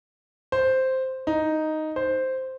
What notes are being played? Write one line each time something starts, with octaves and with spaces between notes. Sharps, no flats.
C5
D#4
C5